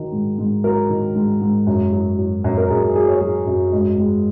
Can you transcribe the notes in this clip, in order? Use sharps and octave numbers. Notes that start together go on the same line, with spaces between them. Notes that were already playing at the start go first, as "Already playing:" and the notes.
Already playing: D#3 F#3
G#2
G#2
F#3 A#4
D#3
G#2
G#2
F#2
F#3
F#3
F#2
A#4
F#2 G#4
G#4
F#3 G#4
C#5
F#3 G#4
F#2
G#2 D#5
G#3